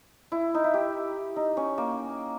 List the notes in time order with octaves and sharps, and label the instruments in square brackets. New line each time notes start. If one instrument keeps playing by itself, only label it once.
[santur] E4
D#4
E4
G4
D#4
C#4
A#3